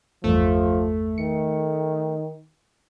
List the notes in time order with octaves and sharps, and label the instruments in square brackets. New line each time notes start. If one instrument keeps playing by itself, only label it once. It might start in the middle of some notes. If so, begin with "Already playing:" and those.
[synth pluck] G#1 E2 G2 [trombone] F3 [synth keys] A3
[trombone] D#3 [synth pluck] C#7